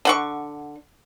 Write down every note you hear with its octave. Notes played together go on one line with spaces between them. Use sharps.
D3 F#5 C#6